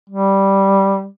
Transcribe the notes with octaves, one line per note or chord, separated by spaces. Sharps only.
G3